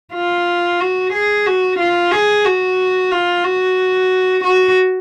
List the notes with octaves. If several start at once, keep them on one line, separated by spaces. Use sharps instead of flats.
F4
F#4
G#4
F#4
F4
G#4
F#4
F4
F#4
F#4